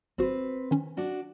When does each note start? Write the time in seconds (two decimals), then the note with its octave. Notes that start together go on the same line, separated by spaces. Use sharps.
0.18 G#1 C4 F#4 B4
0.71 D#3 C#4
0.97 D4 F#4 D5